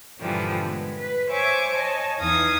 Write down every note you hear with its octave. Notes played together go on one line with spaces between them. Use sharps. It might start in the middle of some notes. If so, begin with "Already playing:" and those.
G2 A#2 D3 E3 F3 G3
G#3 B3
B4
C5 C#5 E5 G#5 C#6 D6
C#5 D#5 G#5 A5
E2 E3 D#4 F5 D#6 G#6